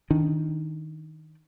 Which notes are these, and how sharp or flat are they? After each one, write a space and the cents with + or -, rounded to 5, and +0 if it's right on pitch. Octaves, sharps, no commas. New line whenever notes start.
D#3 +10 D4 +0